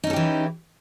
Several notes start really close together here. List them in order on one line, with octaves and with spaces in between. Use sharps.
D#4 C#4 A4 G4 E3